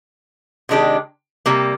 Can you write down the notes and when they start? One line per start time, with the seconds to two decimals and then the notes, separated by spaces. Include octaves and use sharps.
0.69 C3 D#3 G#3 D4 G4
1.46 C3 G3 A#3